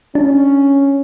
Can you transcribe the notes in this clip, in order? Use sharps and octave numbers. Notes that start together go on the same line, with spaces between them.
C#4 D4